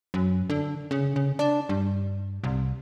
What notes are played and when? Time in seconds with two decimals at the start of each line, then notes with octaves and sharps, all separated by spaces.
0.14 F#2
0.50 D3
0.91 C#3
1.16 C#3
1.39 D4
1.69 G2
2.44 C2